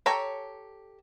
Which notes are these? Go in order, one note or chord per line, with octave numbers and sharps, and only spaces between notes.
G4 A4 C#5 A#5